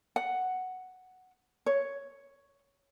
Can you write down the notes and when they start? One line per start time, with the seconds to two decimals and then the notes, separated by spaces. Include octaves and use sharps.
0.16 F#5
1.66 C#5